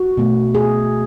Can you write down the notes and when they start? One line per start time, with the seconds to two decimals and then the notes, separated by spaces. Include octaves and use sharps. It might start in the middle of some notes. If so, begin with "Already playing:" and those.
Already playing: F#4
0.17 B2 A3
0.55 G#4